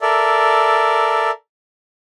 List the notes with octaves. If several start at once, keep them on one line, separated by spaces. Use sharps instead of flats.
A4 A#4 D5 E5